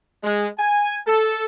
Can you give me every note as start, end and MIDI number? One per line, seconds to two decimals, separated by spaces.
0.23 0.46 56
0.59 0.97 80
1.07 1.45 69